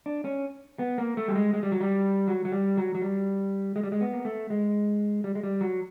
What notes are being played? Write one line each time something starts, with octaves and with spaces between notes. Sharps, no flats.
D4
C#4
B3
A#3
A3
G3
G#3
G#3
G3
F#3
G3
F#3
F#3
G3
F#3
F#3
G3
G#3
G3
G#3
B3
A#3
A3
G#3
G3
G#3
G3
F#3